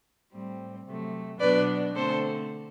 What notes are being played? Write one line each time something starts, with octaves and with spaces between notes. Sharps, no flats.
A2 G3 C4
C3 F#3 A3
B2 F#3 B3 D4 B4 D5
D3 A3 C4 A4 C5